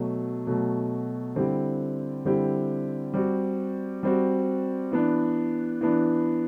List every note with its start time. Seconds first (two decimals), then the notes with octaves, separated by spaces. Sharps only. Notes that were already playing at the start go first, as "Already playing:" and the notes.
Already playing: B2 F#3 A3
0.47 B2 F#3 A3
1.36 D3 G3 C4 E4 G4
2.25 D3 G3 C4 E4 G4
3.14 G3 C4 F#4
4.03 G3 C4 F#4
4.91 E3 B3 D4
5.81 E3 B3 D4